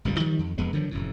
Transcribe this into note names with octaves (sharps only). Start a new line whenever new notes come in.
G1 C#2 A#2 G3
D#3 F3 G3
F2
E1 F2 G#3 B3
D3 D#3 F3 F#3
F1 F#2 A2